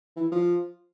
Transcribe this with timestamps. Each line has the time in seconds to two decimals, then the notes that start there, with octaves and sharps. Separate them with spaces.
0.16 E3
0.32 F3